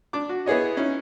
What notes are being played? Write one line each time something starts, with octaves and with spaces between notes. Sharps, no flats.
D4 D6
F#4
B3 E4 G#4 C#5 D#5
C#4 D#4 E4